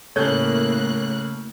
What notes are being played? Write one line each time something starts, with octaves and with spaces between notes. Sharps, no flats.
A2 C#3 A#3 A4 C#5 F#6 G6